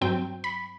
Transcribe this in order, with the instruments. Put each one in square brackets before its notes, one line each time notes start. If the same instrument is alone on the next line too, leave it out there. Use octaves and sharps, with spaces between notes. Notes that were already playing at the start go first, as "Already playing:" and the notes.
[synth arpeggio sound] G2 F#3 C4 G5
B5